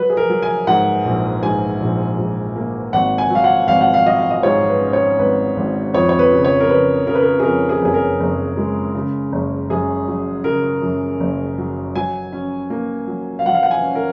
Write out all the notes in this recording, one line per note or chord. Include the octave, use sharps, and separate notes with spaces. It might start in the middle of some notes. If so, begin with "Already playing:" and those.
Already playing: F#3 B4
G#4
A#4
F#3
G#5
G#2 F#5
A#1
G#2 G#5
A#1
G#2
A#3
G#1 F#5
G#5
F#3 F5
F#5
G#1 F5
F#5
F5
F#3 D#5
F5
D#5
G#2 C#5
B4
C#4
C#5
G#1 B4
G#1
F2 C#5
C#5
B4
C#3
C#5
A#4
C#3 B4
C#3 A#4
B4
A#4
G#4
F2 A#4
G#4
F#1 G#4
A#4
F#1
G#3
C#3
F#1
F#2 G#4
F#3
C#3 A#4
F#2
F#1
F#3
F#3 G#5
C#4
A#3
F#3
F5
F#3 F#5
F5
F#5
G#5
C#4
A#4